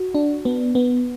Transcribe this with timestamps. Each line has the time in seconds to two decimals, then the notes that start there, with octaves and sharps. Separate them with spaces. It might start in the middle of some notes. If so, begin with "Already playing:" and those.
Already playing: F#4
0.15 D4
0.45 B3
0.75 B3